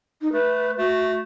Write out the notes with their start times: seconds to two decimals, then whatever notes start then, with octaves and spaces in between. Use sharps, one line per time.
0.21 D#4
0.33 A3 B4
0.78 A3 F#4